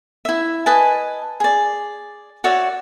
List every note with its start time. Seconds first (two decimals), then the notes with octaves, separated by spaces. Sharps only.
0.25 E4 E5
0.66 B4 D#5 G#5 A5
1.40 G#4 D5
2.44 F#4 C#5 D5 E5